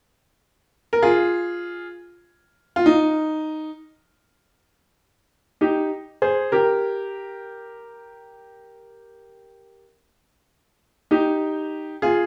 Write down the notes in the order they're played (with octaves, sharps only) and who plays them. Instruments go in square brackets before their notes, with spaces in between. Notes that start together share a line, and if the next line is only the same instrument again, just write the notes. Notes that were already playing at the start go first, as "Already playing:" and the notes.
[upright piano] A#4
F4 G#4
F4
D#4
D#4 G4
G#4 C5
G4 A#4
D#4 G4
F4 G#4